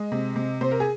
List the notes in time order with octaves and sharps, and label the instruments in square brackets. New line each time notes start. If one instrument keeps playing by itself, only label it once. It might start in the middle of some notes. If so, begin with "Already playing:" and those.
Already playing: [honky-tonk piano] G#3 D#5
C3
C3
C3 C5
A#4
G#4